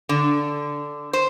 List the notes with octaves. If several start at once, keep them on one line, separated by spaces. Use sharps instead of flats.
D3
C5